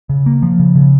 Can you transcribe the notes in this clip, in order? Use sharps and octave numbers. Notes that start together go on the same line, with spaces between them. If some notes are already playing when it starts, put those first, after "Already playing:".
C#3
A#3
F3
C#3
C#3